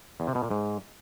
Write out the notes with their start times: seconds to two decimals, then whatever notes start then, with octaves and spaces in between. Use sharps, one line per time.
0.20 E2
0.27 C3
0.35 B2
0.43 A#2
0.50 G#2